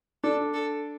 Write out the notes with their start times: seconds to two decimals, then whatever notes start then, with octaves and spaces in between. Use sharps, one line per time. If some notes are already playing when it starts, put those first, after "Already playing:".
0.24 D4 A4
0.54 A4